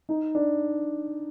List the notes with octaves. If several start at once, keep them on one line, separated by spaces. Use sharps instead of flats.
D#4
D4